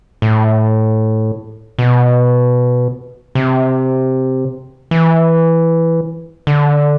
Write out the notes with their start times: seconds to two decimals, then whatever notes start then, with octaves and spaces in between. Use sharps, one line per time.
0.22 A2
1.79 B2
3.35 C3
4.91 E3
6.47 D3